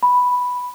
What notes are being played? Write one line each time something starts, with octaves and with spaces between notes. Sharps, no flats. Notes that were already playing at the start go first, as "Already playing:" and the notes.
B5